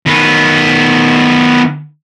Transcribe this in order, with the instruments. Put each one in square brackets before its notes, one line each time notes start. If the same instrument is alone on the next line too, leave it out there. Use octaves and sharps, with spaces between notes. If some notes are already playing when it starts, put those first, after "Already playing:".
[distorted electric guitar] D#3 B3